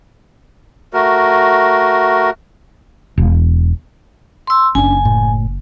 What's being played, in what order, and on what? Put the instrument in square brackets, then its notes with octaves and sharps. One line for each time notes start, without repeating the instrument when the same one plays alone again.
[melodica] A3 F#4 A#4
[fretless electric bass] E1
[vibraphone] C6 E6
[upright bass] F#1 [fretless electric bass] C#4 D4 [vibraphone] G#5
[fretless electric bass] A2